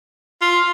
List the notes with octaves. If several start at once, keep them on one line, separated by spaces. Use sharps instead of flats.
F4